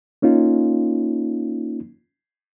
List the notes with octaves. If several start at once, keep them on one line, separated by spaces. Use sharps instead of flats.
A#3 C#4 D#4 F4